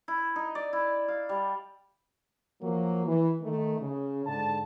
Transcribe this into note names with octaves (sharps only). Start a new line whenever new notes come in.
E4
D#4
D5
E4
F5
G3
F3 F#3 A#3
E3
D#3 A3
C#3
G#2 D3 A5